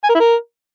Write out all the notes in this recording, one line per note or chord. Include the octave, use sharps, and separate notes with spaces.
G#5
A#4
E4
A#4